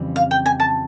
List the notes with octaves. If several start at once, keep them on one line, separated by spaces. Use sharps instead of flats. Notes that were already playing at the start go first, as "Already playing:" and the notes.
Already playing: F2 C#3 E3 G3 C4
F5
G5
G#5
A5